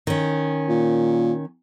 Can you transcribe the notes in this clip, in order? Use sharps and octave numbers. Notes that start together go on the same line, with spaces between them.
D#3 C#4
A#2